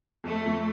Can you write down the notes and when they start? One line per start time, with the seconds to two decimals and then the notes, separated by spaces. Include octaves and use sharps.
0.24 F2 A3
0.46 F2